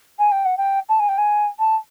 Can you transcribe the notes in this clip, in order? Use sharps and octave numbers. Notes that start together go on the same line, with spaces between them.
G#5
G5
F#5
G5
A5
G#5
G5
G#5
A5